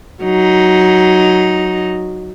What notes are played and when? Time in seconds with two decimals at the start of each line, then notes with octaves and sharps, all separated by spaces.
0.23 F#3 D#4